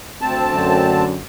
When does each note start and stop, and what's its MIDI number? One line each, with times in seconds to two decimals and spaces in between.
0.22 1.05 38
0.22 1.05 60
0.22 1.05 81
0.53 1.18 42
0.53 1.18 50